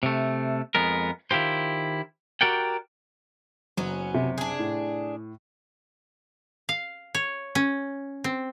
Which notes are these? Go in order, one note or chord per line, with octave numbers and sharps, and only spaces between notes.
C3 A3
F2 G#3 B3 A#4
D#3 E4 F4 G4 C5
F#4 G4 A#4 D5 F#5 G5
F#1 F#3 B3 C#4
C3
D4 G#4
A2
F5
C#5
C#4
C4